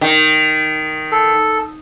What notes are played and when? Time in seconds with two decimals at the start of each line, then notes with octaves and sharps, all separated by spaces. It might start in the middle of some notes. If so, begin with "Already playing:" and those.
0.01 D#3
1.12 A4